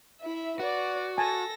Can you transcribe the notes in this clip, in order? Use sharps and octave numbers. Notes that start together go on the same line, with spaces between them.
E4 E5
F#4 B4 D5
A4 G#5 A5 A#6